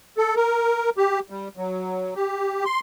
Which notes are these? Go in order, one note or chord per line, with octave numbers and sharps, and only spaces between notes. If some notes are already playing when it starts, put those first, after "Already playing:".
A4
A#4
G4
G3
F#3
G4
C6